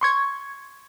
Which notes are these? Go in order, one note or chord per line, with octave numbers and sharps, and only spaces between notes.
C6 C#6 G#6